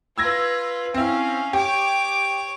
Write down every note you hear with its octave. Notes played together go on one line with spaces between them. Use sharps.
F4 B4 E6 G#6 A#6
C4 C#4 E4 F5
G4 C#5 D6